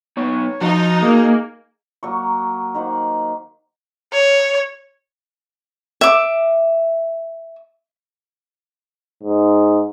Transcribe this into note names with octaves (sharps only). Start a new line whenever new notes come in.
B3 D#4 C#5
F3 D#4 F#4 F5
A#3 G#4
F#3 A#3 C#6
D#3 A#3 C5 F#5
C#5
E5 D6
G#2